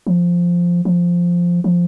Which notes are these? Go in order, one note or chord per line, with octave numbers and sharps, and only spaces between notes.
F3
F3
F3